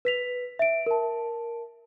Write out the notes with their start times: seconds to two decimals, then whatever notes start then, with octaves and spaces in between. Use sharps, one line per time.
0.05 B4 B6 F7
0.59 E5 D7
0.86 A#4 A5